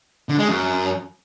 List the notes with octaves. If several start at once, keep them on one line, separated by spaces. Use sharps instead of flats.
D3
G#3
F#2